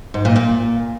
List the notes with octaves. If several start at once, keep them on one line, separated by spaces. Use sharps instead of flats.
G#2
A#2
A#2